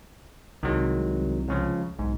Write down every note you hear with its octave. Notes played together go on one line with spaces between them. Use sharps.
C2 D#3 F#3 G#3
C#2 C#3 F3
B1 G#2